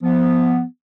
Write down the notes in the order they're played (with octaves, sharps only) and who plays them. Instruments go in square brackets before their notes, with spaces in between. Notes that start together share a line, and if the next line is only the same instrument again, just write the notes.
[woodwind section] F3 B3